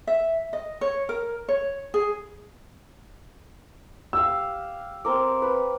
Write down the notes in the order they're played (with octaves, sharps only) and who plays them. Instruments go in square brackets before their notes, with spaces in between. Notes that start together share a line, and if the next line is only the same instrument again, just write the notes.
[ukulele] E5
D#5
C#5
A#4
C#5
G#4
[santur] G4 F5 [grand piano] E6
[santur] C4 A#4 D6
B4